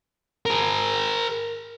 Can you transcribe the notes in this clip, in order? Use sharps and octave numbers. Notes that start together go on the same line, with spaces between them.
G#4 A#4